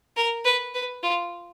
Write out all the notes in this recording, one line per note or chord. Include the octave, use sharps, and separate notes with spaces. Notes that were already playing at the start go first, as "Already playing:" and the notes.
A#4
B4
B4
F4